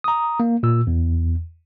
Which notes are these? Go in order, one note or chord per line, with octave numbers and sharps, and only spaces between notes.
A#5 D#6
A#3
A#2 E6
E2